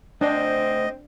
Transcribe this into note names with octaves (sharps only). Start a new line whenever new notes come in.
A3 C4 D4 C5 D#5